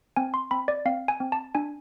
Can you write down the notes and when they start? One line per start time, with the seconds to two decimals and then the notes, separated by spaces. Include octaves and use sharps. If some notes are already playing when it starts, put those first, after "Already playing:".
0.16 C4 G#5
0.34 C6
0.51 C4 B5
0.68 D5
0.85 C4 F5
1.08 G#5
1.20 C4
1.32 A5
1.55 D4 G#5